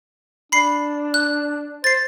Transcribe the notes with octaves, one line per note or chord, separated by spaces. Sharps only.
D4 B5 C7
F#6
C5 A6 C7